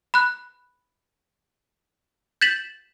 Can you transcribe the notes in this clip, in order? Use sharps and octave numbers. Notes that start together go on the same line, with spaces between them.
B5 F#6
G6 A6 B6 E7 F#7